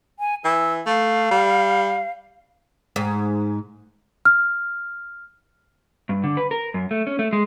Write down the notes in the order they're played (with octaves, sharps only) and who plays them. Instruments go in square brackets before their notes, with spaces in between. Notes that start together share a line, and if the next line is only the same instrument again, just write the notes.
[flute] G#5
[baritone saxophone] E3 [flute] E6
[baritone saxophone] A3 [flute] F5
[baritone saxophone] G3
[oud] G#2
[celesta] F6
[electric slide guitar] G2
D3
B4
A#4
F#2
A3
C#4
A3
G#3